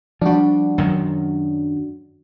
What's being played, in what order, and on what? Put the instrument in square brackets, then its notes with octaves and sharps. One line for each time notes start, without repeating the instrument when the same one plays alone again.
[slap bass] F3 G3 [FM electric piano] D4 F#4
[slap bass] F#2 D#3 F#3